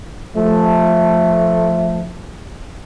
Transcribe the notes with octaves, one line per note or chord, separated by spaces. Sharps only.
F3 A3